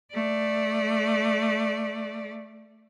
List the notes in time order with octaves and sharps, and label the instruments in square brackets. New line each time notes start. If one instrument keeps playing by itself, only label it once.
[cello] A3 D5